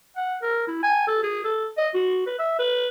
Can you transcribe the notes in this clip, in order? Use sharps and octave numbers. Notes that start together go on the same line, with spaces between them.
F#5
A#4
E4
G#5
A4
G#4
A4
D#5
F#4
B4
E5
B4